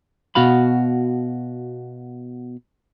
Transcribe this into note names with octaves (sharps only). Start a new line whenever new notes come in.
B2 F#4 F5 B5